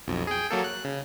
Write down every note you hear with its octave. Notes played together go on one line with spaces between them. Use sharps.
B1 F2
G#4 G5
F#3 A#3 A4
F#6
C#3